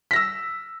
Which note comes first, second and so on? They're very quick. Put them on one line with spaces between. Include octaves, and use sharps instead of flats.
B6 A#6 E6